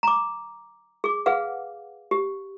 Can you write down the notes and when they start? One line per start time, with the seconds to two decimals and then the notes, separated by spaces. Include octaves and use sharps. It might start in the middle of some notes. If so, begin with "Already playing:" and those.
0.03 A#5 D6
1.04 G#4 D6
1.26 G#4 B4 F5 F#5
2.11 G4